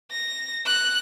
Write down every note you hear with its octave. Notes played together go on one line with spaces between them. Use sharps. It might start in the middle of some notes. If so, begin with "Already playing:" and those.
A#6
F#6